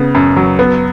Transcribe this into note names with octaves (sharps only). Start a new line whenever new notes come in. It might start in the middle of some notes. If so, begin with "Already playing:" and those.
Already playing: C#3 B3
F#2
F#3
B3